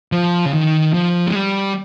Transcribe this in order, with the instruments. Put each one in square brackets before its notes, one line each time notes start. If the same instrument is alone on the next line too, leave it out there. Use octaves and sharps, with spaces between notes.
[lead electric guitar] F3
C#3
D#3
F3
G#3
G3